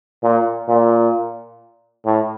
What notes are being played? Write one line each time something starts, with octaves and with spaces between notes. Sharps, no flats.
A#2
A#2
A2